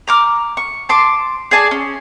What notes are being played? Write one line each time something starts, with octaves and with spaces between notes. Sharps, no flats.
A#5 D6 F6
C#6
A5 C6 D6
G#4 D5 G#5 A5
C#4